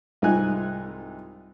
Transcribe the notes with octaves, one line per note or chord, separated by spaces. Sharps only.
C2 G#2 D#4 F4 G#5 F#6